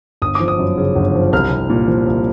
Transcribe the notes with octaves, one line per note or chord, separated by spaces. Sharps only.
G1 D#6
F3 D6
D#6
F#2
C#3
G1
F3
C2 F6
C2
A#2
F3
C2